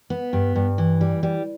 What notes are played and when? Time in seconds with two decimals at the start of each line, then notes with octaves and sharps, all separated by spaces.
0.10 B3
0.33 G2
0.56 G2
0.78 E3
1.01 G3
1.23 G3